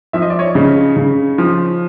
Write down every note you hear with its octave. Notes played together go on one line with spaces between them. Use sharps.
F3 E5
D#5
D5
C#5 D#5
C#3
C#3
F3